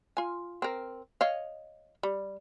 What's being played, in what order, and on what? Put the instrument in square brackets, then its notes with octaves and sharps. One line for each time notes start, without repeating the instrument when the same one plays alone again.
[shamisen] F4 G#5
C4 A#4
C#5 D#5 F5
G3